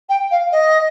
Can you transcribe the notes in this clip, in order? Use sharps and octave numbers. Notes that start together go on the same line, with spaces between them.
G5
F5
D#5